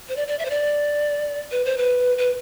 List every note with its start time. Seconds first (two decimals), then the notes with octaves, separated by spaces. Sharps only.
0.09 C5
0.16 D5
0.28 D5
0.39 E5
0.45 C5
0.50 D5
1.51 B4
1.65 C5
1.78 B4
2.18 B4